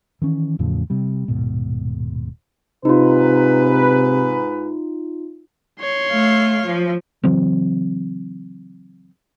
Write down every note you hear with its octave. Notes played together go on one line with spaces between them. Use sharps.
D#3 E3 C#4
E2 A2 C#3 F3
C3 G3
D#1 G#2 B2
G#2 C3 D#4 F4 B4
C#5 C6
A3 F5
F3
C#3 E3 F#3 C4